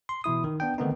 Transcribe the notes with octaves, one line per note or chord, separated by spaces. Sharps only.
C6
B2 E3 E4 D#6
D#3
B3 D4 G5
D3 D#3 A3 B3 C4 D#4